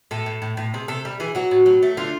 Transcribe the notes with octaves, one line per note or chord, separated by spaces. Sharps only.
A2 A4
A2
A2
A2
C3 G#4
C3 A4
G3
E3 G#4
F#3 F#4
A2
F#3
A3
D3 F4